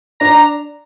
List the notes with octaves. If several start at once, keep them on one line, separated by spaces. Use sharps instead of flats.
D4 A#5